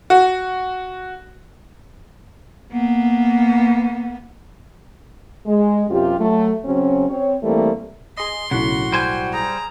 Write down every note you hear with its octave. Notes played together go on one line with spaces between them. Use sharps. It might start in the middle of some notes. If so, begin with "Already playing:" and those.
F#4
A#3 B3
G#3
F#2 C3 F4 G4
F#3 A3
C#3 F#3 C4 C#4
C4 C#5
E3 G3 A3 A#3 C4
G#4 D#5 C6
B1 A2 C#3 F#4 F#5
G3 C5 G#5
G#4 A#5